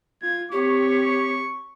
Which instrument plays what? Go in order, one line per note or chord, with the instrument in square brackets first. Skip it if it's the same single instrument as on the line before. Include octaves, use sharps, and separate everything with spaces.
[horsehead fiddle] F4 [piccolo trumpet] G#6
[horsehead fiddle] C4 C#5 [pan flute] G4 [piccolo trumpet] C#6